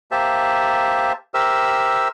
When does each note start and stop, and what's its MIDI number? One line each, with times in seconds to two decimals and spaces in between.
0.11 1.13 58
0.11 1.13 67
0.11 1.13 72
0.11 1.13 76
0.11 1.13 81
1.34 2.08 67
1.34 2.08 70
1.34 2.08 72
1.34 2.08 76
1.34 2.08 88